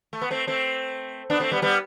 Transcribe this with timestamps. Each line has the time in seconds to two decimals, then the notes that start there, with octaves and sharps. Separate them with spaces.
0.13 A3
0.22 B3
0.31 A3 C4
0.47 A3 C4
1.30 B3 D4
1.40 A3 C4
1.51 G3 B3
1.62 G3 B3